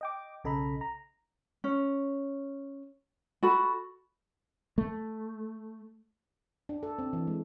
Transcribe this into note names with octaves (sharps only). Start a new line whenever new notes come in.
D#5 G5 D6
B1 C#3 A4 D#5 A#5 B5
A#5
C#4
F#4 A4 B5
A3
D4
A4
C4
E3
G#3